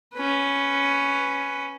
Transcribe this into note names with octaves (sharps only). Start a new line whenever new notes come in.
C#4 B4